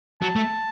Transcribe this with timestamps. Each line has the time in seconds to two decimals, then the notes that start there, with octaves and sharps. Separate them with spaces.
0.21 F#3 A5
0.36 A3